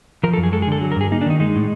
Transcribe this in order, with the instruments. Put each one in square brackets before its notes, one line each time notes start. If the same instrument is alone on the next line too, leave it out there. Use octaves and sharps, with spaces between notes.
[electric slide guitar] F3 A#4
A4
F#2
G#4
G#3 A4
G#4
D3 A4
F#3
A#4
G2 G#4
A#3 D#4
D4
D#3 D#4
G#3 D#4
A2